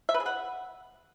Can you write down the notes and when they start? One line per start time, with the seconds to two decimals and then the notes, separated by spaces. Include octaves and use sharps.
0.09 E5
0.14 B4
0.20 G#4
0.26 F#5